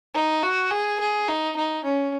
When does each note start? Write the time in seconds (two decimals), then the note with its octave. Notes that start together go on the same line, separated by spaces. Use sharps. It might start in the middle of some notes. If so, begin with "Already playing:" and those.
0.15 D#4
0.43 F#4
0.71 G#4
1.00 G#4
1.28 D#4
1.56 D#4
1.84 C#4